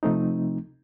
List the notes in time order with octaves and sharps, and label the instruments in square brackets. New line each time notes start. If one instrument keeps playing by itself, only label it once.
[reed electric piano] C3 F3 A3 C4 D#4